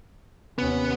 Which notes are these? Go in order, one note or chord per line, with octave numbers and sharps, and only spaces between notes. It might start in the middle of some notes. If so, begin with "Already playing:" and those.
D#2 C3 B3 C#4